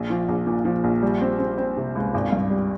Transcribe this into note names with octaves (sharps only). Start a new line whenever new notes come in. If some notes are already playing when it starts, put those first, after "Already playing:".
Already playing: A#1
F3
A#1
A#2
F3
A#1
G3
C4
C4
C4
C3
C#2
G#1
G2
G3